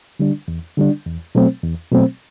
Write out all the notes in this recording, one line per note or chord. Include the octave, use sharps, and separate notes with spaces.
D3 G3 D4
E2
D3 G3 D4
E2
B2 F#3 A3 C4
E2
B2 F#3 A3 C4